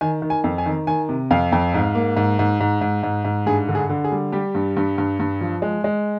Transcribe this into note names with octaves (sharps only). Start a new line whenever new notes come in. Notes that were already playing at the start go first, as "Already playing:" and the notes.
D#3 G#5
D#3
G#5
F2
G#5
D#3
D#3 G#5
C3
F2 F5
F2
G#2
A#3
G#2
G#2
G#2
G#2
G#2
G#2
G2 G#4
D3
G#4
D3
G#4
G3
G3 G4
G2
G2
G2
G2
F3
G#3
G#3